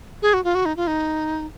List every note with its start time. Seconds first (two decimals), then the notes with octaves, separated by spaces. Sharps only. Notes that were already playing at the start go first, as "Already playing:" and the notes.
0.22 G#4
0.34 F#4
0.44 F4
0.55 F#4
0.65 D#4
0.77 F4
0.87 D#4